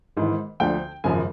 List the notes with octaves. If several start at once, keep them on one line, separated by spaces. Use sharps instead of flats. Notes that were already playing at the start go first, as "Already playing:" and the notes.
G#1 G#2 E3
D2 D3 F3 G5
G#1 F#2 C#3 F3 G#5